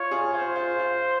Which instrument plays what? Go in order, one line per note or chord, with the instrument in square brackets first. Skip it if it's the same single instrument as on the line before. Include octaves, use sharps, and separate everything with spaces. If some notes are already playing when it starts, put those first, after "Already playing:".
Already playing: [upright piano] F4 [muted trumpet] C#5
[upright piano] F4 G#4
[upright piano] F4 [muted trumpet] C5
[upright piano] F4
F4